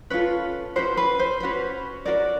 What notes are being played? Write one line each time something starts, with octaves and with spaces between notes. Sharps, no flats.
C#4 F4 A4 B4
C#4 F#4 B4 C5
B4
C5
C#4 F#4 B4
C#4 F#4 A#4 D5